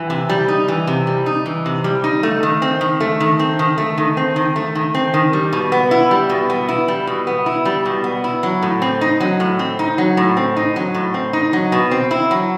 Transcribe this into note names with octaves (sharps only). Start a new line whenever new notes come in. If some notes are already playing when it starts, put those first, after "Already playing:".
Already playing: E3
C3
G3
D#4
E3
C3
G3
D#4
E3
C3
G3
D#4
A3
D#3
C4
D#3
A3
D#3
C4
D#3
A3
D#3
C4
D#3
A3
D#3
C4
D#3
G3
B2
B3
E4
G3
B2
B3
E4
G3
B2
B3
E4
G3
B2
B3
E4
F#3
A2
C4
D#4
F#3
A2
C4
D#4
F#3
A2
C4
D#4
F#3
A2
C4
D#4
F#3
B2
C4
E4
F#3